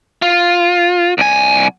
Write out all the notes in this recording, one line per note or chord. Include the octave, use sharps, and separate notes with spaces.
F4
C2 G#5